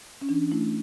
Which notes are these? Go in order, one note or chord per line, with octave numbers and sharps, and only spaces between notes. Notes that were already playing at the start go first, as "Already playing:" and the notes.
C#4
E3 D4
A3 E4